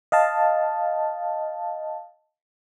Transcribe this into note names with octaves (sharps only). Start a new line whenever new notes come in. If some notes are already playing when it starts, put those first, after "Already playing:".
D#5 F5 A5